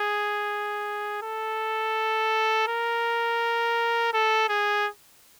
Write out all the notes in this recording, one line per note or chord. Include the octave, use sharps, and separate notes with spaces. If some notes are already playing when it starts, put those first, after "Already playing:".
Already playing: G#4
A4
A#4
A4
G#4